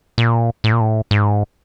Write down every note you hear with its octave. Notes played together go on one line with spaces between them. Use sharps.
A#2
A2
A#2
A2
G#2